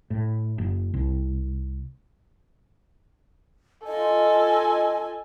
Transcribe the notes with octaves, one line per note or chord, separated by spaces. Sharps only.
A2
F#1
C2
F4 A4 D#5 G#5